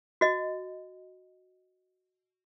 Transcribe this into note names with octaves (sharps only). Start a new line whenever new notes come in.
F#4 D#5